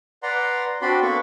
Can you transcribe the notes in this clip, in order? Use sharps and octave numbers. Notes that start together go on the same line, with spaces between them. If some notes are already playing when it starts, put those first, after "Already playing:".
B4 D5 F#5 A#5 C6
C4 D4 F#4 D5 B5 C6
A#3 B3 D4 A4 B5 C#6